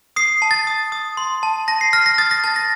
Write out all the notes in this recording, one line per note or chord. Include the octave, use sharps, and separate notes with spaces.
D#6 C7
A5
A6
D#6
D#6
C6
A5
A5 A#6
C7
F6 A#6
A#6
D#6 A6
A#6
A5 A6
A#6